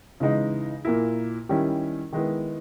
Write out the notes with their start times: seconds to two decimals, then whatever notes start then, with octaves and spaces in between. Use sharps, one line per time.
0.20 C#3 E3 G#3 D#4
0.85 A#2 A#3 E4
1.49 D#3 G3 C#4 E4
2.12 D#3 G#3 B3 E4